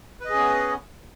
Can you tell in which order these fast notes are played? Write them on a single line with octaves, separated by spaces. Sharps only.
B4 D#5 G#4 C#4 B3